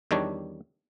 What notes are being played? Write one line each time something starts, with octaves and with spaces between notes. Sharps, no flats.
E2 D#3 G3 D4 C#5